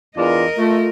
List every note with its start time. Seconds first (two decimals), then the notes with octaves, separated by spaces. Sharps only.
0.16 E2 D4 F4 A#4 D#5
0.58 A3 F4